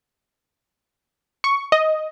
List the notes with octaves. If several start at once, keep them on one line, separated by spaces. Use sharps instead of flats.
C#6
D#5